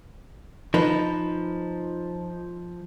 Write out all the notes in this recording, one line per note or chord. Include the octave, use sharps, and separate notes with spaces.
F3 D#4 B4